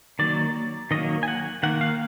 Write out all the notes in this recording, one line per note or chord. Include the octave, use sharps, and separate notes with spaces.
D#3 F#3 A#3 D5
D#3 F#3 A#3 D#5
G#5
F#5
D#3 A#3 F#5
F5